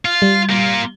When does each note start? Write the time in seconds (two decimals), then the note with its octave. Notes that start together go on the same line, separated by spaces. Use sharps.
0.05 F4
0.22 G3
0.50 A#3 F4